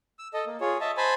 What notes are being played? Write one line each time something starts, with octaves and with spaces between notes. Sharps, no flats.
E6
A4 D#5
A#3
F4 G#4 C#5
D#5 E5 A5
C5 G#5 A5 B5